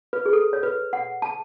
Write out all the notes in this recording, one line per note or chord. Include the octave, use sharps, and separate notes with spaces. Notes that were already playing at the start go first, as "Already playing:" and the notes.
B4
G#4
A4
C#5
B4
F#5
A5